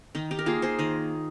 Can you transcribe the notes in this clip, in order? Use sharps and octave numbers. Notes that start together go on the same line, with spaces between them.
D#3 D#4
D#4 G4
A#4
A#3 F4 G#4
G#4 C5
D#3 D#5